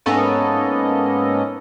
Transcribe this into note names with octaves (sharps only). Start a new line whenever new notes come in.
G#2 A#3 B3 C#4 A4 D#5